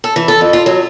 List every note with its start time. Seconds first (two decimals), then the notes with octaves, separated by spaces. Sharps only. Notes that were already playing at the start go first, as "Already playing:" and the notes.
0.04 A4
0.16 E3
0.28 A4
0.41 F2
0.53 F4
0.66 F#3